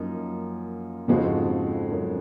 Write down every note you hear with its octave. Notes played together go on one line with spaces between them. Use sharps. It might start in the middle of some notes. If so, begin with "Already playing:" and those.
Already playing: F#2 F3 A#3 D#4
F2 G#2 C#3 F3 G#3 C4 F#4
F#2